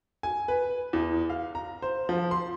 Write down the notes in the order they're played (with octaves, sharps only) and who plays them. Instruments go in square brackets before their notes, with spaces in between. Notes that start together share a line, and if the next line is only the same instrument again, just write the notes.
[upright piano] G#5
B4
E2
F5
A#5
C5
F3
C6